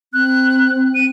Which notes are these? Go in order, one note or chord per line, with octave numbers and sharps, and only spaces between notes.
C4 F#6
D#7